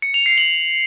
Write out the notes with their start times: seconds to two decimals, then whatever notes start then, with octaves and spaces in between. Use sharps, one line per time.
0.02 C#7
0.14 F7
0.26 C7
0.38 F#7